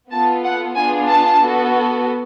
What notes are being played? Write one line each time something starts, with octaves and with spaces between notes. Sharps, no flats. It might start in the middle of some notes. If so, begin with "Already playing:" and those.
B3 F4 A4 A5
F#5
B3 D4 F4 G#4 G#5
A5
B3 F#4 A4